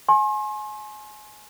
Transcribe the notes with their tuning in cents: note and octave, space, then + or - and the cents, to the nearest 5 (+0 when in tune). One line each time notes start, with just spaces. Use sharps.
G#5 +25 C6 +40